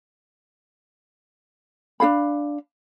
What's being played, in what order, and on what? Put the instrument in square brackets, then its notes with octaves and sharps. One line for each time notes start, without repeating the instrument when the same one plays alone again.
[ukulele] D4 G#4 F5 B5